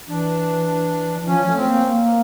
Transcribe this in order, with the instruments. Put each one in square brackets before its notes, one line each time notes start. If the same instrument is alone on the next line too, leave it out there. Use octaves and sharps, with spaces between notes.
[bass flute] E3 [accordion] D4
[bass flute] E3
[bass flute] F3 [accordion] C#4
[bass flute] A3
[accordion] C4
[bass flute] A#3
A#3